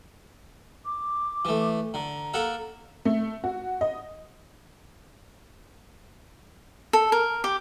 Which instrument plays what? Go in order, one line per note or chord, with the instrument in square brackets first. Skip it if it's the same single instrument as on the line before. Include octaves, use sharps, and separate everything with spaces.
[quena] D6
[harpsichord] E3 A3
[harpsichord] D3 [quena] A#5
[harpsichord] A#3 A4 F#5
[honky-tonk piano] A3
F#4
D#5
[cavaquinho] A4
A#4
G4